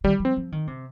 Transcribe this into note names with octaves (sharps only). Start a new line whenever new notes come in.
D#3 G3
F3
C4
F3
D#3
C3